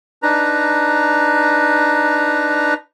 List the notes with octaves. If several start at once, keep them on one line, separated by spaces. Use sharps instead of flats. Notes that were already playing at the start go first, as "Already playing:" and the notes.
D4 D#4 B4 A#5